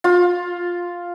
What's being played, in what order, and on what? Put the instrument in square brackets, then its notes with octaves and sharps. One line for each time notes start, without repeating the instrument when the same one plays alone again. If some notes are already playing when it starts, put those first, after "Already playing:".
[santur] F4